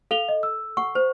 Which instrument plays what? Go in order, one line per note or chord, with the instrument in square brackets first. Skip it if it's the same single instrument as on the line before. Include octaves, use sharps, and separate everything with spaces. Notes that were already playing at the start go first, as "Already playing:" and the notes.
[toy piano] A4 [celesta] F5 F7 G7
[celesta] D#5
E6
[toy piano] F#5 C#6
C5